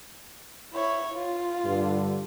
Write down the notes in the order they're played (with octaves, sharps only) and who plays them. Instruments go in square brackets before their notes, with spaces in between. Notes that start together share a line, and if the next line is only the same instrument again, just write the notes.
[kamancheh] E4 C#5
F4
[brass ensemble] G2 D3